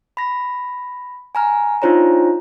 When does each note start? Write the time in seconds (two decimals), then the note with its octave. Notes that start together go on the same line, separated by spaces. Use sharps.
0.17 B5 A#6
1.35 G#5 A#5 F6
1.82 D4 D#4 F4 C5 C#5 A#5